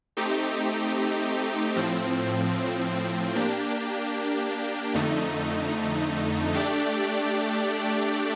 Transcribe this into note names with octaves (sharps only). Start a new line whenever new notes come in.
A3 C4 D#4 G4
A2 F3 C4
A#3 D4 G4
F2 D3 A3 D#4
A3 D4 G4 D5